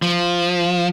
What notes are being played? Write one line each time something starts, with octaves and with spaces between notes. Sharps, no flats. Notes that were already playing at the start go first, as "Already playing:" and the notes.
F3